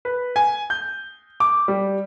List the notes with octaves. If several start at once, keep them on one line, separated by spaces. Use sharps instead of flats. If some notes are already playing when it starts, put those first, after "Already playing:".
B4
G#5
G6
D6
G3